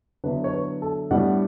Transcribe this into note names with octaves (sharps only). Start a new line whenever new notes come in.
D3 F#3 B3 E4 B4
C#5
B4
A4
A2 G3 B3 D4 F#5